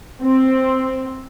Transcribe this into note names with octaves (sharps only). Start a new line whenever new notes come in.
C4